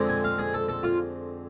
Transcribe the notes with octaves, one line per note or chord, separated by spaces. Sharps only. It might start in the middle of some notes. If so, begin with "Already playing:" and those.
Already playing: F2 D3 G#3 C4
G#5
F5
G#4
A4
A4
F4